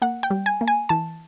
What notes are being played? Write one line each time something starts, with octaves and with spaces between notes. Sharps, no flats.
A#3 F#5
G5
G3
G#5
A#3
G#5
E3 A5